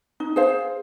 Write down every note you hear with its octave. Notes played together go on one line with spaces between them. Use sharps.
D#4
G#4 C5 F5